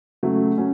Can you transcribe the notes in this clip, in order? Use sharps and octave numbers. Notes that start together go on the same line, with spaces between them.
C#3 F#3 A3
F#3 C#4